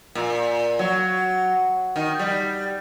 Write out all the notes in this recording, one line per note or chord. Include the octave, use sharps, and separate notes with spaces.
A#2
F#3
D#3
G3